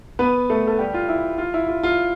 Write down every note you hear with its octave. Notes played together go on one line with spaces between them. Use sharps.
B3 B4
A3 A4
A4
G3 G4
F4
E4
F4
E4
F4
F4